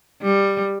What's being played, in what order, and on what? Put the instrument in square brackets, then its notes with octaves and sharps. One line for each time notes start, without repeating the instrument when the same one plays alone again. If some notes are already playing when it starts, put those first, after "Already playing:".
[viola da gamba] G3